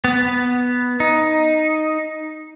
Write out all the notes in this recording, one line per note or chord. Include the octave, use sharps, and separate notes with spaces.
B3
D#4